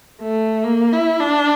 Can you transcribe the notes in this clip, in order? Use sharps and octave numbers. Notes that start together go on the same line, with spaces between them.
A3
A#3
E4
D4